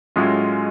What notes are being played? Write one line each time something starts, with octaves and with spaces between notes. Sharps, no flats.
A2 F#3 G#3 C#4 F4